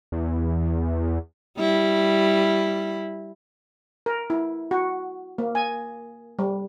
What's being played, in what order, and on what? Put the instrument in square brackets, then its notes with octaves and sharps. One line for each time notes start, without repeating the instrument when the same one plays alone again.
[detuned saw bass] E2
[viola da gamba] G3 E4
[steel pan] A#4
E4
F#4
A#3
G#5
G3